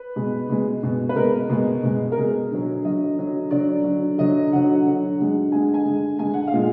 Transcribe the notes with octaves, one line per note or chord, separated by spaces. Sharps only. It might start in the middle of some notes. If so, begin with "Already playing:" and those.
Already playing: B4
B2 G#3
B2 G#3
B2 G#3
B4
B2 G#3 A#4
B2 G#3
B2 G#3
A#4
B2 G#3 G#4
D3 F#3
D3 F#3 D#5
D3 F#3
D3 F#3 D5
D3 F#3
D3 F#3 D#5
D3 F#3 F#5
D3 F#3
D3 G#3
D3 G#3 G#5
G#5
D3 G#3
D3 G#3 G#5
F#5
F5
A#2 G#3